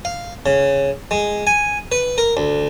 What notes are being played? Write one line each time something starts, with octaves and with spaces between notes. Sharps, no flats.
F5
C#3
G#3
G#5
B4
A#4
D2